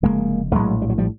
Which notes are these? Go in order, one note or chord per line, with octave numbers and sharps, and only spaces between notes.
F1 E2 C#3 G#3 A#3
A3
A#1 A2 F#3 G#3
G3
F#3
F3 G3